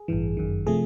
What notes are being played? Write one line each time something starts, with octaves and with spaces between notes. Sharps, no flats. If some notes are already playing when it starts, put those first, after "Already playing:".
Already playing: G#4
A1 G2 E3
G1 F#2 D#3
C3 F3 A3 G#4